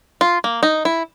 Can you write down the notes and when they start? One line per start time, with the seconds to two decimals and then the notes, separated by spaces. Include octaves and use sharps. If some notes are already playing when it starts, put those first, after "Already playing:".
0.21 F4
0.44 A#3
0.63 D#4
0.85 E4